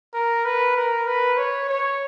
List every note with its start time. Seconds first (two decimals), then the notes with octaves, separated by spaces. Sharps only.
0.14 A#4
0.45 B4
0.76 A#4
1.07 B4
1.37 C#5
1.69 C#5